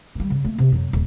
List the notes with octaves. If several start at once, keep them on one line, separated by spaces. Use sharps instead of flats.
D#3 G3
C#3
A3 A#3
C3
F2 F#3
D#1